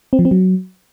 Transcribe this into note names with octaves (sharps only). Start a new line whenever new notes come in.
C4
F3
C4
F#3